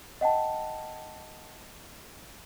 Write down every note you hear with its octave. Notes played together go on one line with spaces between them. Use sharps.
D#5 F#5 G5 A5